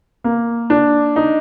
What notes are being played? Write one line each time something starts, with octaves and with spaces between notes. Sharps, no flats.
A#3
D4
D#4